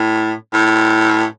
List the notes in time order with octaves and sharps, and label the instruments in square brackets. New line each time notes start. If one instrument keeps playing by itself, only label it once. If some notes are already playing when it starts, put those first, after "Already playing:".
Already playing: [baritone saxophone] A2
A2